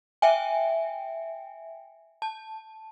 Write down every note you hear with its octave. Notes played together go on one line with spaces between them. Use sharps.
E5 G5 G#5
A5